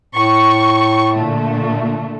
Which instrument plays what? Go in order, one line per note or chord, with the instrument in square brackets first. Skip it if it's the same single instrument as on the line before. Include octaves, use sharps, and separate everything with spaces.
[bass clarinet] A2 [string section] C#6
[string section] A#2 D3 A3